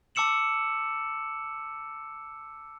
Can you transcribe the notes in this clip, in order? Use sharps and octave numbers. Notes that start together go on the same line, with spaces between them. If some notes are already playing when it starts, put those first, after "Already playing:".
A5 D6 E6 C#7 E7 F#7